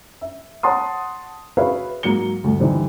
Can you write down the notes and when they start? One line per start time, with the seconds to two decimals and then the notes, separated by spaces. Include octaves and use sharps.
0.21 E5
0.63 C#5 F#5 A5 C6 D#6
1.57 F#4 G#4 B4 C#5 E5 F5
2.03 G#2 F#3 A#3 C#7 G7
2.44 D2 G2
2.59 D3 E3 G3 D#4 C5